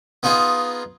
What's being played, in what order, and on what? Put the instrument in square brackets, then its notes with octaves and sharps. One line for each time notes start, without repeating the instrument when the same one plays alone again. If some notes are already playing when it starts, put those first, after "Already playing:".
[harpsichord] B3 D#4 F4 G#4